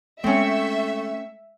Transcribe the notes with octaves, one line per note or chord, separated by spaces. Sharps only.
G#3 A3 C4 C#4 E5